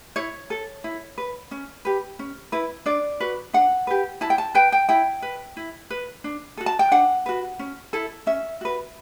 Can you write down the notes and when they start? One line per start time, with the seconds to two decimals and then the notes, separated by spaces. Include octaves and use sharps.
0.16 E4 C#5
0.50 A4
0.84 E4
1.18 B4
1.51 C#4
1.85 G4 B4
2.19 C#4
2.52 E4 B4
2.86 D4 D5
3.20 F#4 B4
3.53 D4 F#5
3.87 G4 B4
4.21 E4 A5
4.30 G5
4.38 A5
4.55 B4 G5
4.72 G5
4.89 E4 G5
5.22 B4
5.57 E4
5.90 B4
6.24 D4
6.57 F#4 A4
6.66 A5
6.79 G5
6.91 D4 F#5
7.26 F#4 B4
7.59 C#4
7.93 E4 A4
8.27 C#4 E5
8.61 F#4 B4